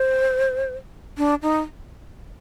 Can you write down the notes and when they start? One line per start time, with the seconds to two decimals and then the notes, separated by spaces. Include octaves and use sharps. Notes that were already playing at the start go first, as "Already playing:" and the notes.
Already playing: C5
1.18 D4
1.42 D#4